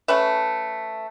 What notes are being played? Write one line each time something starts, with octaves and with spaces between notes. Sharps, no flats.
A3 C#4 B4 E5